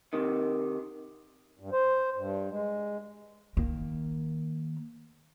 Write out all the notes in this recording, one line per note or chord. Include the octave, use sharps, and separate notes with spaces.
C3 D#3
G2
C5
G2
G#3
D#3 A#3